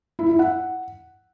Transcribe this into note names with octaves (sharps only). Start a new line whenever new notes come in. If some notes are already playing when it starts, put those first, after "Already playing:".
E4
E4
F#5